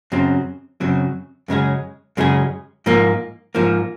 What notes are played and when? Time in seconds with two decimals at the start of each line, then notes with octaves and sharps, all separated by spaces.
0.12 F#2 C#3 F#3 C4
0.80 F#2 C#3 F#3 C4
1.48 F#2 C#3 G#3 C#4 G#4
2.17 F#2 C#3 G#3 C#4 G#4
2.86 G#2 F3 A#3
3.55 G#2 F3 A#3